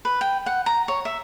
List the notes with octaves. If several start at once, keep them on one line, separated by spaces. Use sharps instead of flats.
B4
G5
F#5
A#5
C#5
E5